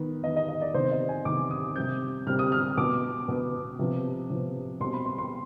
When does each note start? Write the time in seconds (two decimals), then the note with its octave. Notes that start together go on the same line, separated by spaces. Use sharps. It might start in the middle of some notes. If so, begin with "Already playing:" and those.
Already playing: D#3 B3
0.24 D#3 B3 D#5
0.36 D#5
0.49 D#5
0.61 D5
0.74 C3 D#3 B3 C5
0.91 D#5
1.09 G#5
1.25 C3 D#3 B3 D6
1.51 D#6
1.76 C3 G3 C4 G6
2.27 C3 G3 C4 F6
2.39 D#6
2.52 F6
2.77 B2 B3 D6
3.28 B2 B3
3.79 C3 F3 B3
4.30 C3 F3 B3
4.80 B2 G3 C4 C6
4.93 B5
5.06 C6
5.18 C6